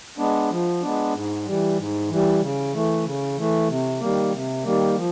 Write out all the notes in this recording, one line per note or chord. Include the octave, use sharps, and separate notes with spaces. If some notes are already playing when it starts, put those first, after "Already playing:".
G#3 B3 D4
F3
G#3 B3 D4
G#2
E3 G3
G#2
E3 G3
C#3
E3 A3
C#3
E3 A3
C3
D#3 G3 A#3
C3
D#3 G3 A#3
F3